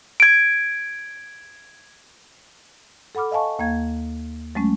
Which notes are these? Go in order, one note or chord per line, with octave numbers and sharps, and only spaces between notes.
G#6 D7
A4 F#5 B5 D6 F6
D#5 F5 G#5 A5 C#6
D#2 A#3 F5 G#6
F#3 G#3 A3 C#4